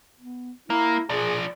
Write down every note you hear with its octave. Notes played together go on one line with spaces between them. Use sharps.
B3
A#3 E4
F3 G#4 D5